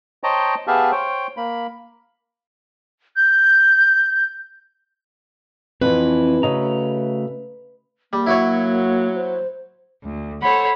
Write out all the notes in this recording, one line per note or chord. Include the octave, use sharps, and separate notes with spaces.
C5 C#5 D#5 G5 A5 A#5
B3 G4 G#4 E5 F5 A5
C5 C#5 G5
A#3 B5
G6
F2 E3 C4 B4
C#3 A3 F#4 D#5 A#5
G3 A#3
F#3 E4 F#4 C#5
C5
D2
A4 C5 C#5 F#5 B5